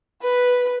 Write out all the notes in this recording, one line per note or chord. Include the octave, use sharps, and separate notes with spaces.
B4